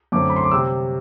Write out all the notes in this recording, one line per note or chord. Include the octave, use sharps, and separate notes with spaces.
F#2 D3 A3 C4 D6
B5
C6
D6
C3 G3 C4 E6